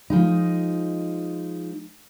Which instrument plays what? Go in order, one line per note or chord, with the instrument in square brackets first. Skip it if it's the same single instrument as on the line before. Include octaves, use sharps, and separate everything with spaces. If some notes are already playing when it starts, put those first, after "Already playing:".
[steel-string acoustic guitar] F3 G#3 D#4